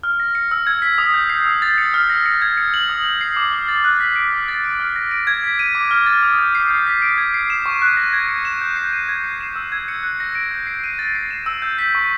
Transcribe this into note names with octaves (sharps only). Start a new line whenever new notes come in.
F6
A#6
C#7
E6
G#6
B6
D#6
G6
C7
E6
A6
C#7
F6
A#6
C#7
G#6
C#7
F#7
D#6
G6
C7
D6
F6
A6
F#6
B6
D7
F6
A6
D7
F6
A#6
D7
G#6
B6
D#7
D6
F6
A6
D#6
G6
C7
G6
B6
D7
G#6
C7
E7
C#6
F#6
A#6
G#6
C#7
E7
G6
C7
D#7
G#6
C7
E7
E6
G#6
C#7
F#6
A#6
D7
G6
C7
D#7
A6
C7
E7
E6
G6
B6
C#6